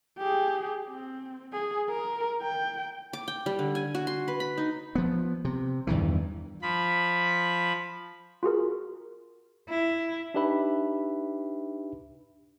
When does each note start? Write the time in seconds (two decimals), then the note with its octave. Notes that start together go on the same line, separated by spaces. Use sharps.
0.18 G4 G#4
0.88 C4
1.53 G#4
1.89 A#4
2.42 G5
3.13 D6
3.28 G5
3.46 G3
3.59 D3
3.75 G#5
3.95 F#4
4.07 C6
4.28 B4
4.40 B5
4.58 D#4
4.95 F3 B3
5.45 C3
5.87 E2 G2 D#3 E3
6.62 F3 B5
8.43 F4 F#4 G#4 A#4
9.69 E4
10.34 D4 D#4 G4 B4 E5 B5